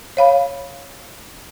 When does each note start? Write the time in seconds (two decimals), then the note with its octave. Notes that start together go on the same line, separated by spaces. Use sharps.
0.17 C#5 F5 B5